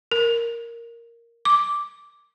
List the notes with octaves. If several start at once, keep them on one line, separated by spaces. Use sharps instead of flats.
A#4
D6